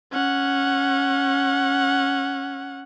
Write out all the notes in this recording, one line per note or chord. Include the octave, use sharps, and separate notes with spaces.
C#4 F#5